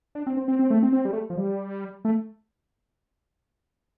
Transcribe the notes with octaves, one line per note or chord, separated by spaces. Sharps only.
D4
C4
C4
C4
C4
A3
C4
C4
G3
A3
F3
G3
A3